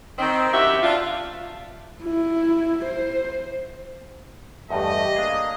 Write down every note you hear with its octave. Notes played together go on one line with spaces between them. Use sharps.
D#3 C4
F#2 F#4 G4 E5
D4 F4
E4
C5
E2 G2 A3 G4 D#5
A#3 D4 G#4 A#5 B5 D#6